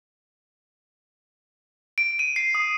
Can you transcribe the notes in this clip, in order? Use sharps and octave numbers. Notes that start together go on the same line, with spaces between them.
D7
D#7
C7
D#6